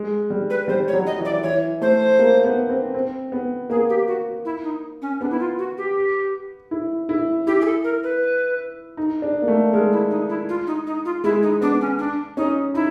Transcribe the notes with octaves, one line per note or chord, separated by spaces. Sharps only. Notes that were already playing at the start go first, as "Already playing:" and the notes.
Already playing: G#3
G3
B4
G3 C5
C#5
F#3
D#5
E3
D5
E3 C#5
A3 C5
A#3
B3
C4
C4
B3
A#3 G#4
G4
F#4
E4
D#4
C#4
B3 D4
E4
F4
F#4
G4
E4
E4
E4 G4
G#4
A4
A#4
B4
D#4
D4
A#3
A3
G#3 A#4
E4
D#4
E4
F4
D#4
D#4
F4
G#3 E4
D#4
B3 D4
C#4
D4
C#4 D#4
D#4 E4